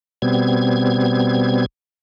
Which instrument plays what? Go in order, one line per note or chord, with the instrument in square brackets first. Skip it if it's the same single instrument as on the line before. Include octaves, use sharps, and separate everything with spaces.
[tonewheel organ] B2 G3 B3 C4 G#6